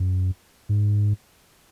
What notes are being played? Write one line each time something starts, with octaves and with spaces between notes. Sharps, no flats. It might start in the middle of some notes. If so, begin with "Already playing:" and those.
Already playing: F#2
G#2